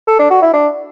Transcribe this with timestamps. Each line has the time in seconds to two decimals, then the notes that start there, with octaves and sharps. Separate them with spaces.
0.07 A4
0.19 D4
0.30 F#4
0.42 E4
0.53 D4